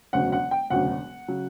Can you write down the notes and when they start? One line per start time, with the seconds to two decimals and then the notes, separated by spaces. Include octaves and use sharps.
0.13 E1 D2 C#3 F#3 F#5
0.32 F#5
0.51 G5
0.70 E1 D2 C#3 F#3 F#5
1.28 C#3 F#3